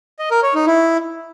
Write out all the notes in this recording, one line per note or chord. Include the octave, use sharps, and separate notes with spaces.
D#5
A#4
C#5
D#4
E4